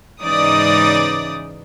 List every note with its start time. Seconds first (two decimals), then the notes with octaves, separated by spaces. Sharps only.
0.23 G#2 C#3 E3 D#4 D5 D#6